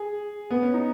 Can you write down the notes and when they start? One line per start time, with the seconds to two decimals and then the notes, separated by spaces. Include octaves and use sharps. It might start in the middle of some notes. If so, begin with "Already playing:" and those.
Already playing: G#4
0.50 B3
0.63 C#4
0.74 D#4